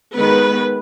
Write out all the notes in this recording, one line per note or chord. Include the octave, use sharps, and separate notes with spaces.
D#3 G#3 B3 B4